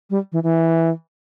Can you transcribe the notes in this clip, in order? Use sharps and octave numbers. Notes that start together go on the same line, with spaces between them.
G3
E3
E3